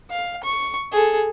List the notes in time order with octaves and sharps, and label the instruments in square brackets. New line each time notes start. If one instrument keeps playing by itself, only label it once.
[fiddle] F5
C#6
G#4 A4